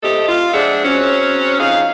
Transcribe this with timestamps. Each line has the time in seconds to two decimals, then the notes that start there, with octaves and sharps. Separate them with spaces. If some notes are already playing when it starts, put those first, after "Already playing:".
0.03 A2 C3 G4 A4 D#5
0.29 F4
0.54 F3 G#3 D4 E5 F#5
0.84 F#3 C4 C#4
1.60 F2 D#4 G#4 F5